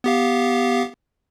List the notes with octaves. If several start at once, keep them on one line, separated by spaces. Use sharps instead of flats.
B3 G4 F5